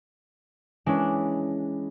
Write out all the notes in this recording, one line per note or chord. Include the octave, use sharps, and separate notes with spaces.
E3 G#3 C#4 D4